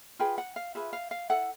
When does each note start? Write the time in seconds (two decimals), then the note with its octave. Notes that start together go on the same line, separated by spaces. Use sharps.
0.19 F4 G#4 B4 G5
0.38 F#5
0.56 F5
0.75 F4 G#4 B4 E5
0.93 F5
1.11 F5
1.30 E4 A4 F#5